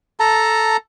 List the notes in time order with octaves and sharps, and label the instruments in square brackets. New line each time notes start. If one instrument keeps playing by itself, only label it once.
[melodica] A4 A5 A#5